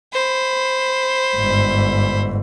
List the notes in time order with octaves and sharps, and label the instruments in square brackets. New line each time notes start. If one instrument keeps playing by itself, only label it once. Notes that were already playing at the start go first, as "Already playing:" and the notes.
[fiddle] C5 B5
[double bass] G1 G#2